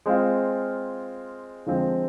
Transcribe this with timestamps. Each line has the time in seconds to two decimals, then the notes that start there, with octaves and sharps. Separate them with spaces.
0.06 G#3 C4 F4
1.66 D3 F3 G#3 C4